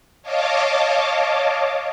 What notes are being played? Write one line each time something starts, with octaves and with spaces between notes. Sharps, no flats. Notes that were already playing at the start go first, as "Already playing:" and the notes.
C#5 D#5 F5 A5 D6